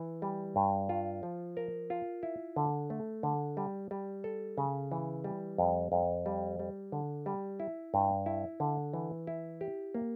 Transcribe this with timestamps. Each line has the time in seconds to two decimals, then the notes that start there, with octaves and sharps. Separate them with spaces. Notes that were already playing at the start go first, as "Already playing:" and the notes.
Already playing: E3
0.22 G3
0.56 G2
0.89 F4
1.23 F3
1.57 A#4
1.90 F4
2.23 E4
2.56 D3
2.90 A3
3.23 D3
3.57 G3
3.91 G3
4.24 A4
4.58 C#3
4.92 E3
5.24 G3
5.58 F2
5.92 F2
6.26 G3
6.59 G3
6.92 D3
7.26 G3
7.60 E4
7.94 G2
8.26 E4
8.60 D3
8.93 E3
9.27 E4
9.61 G4
9.94 A#3